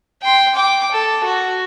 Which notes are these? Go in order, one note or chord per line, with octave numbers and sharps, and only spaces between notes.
G5 C6
G5 D6
A4
F#4